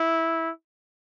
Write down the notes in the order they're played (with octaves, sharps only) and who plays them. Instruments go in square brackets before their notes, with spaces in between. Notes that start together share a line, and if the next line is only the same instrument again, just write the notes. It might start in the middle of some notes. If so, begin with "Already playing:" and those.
Already playing: [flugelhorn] E4